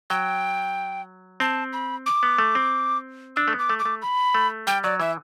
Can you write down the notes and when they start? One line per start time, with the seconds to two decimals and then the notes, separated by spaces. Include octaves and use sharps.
0.10 F#3 G5
1.40 C4 A5
1.73 B5
2.06 D6
2.23 B3
2.38 A3
2.55 C4
3.36 D4 E6
3.48 A3
3.53 B3
3.59 D6
3.70 A3
3.79 D6
3.85 A3
4.02 B5
4.34 A3
4.67 G3 G5
4.84 F#3 D5
5.00 E3 E5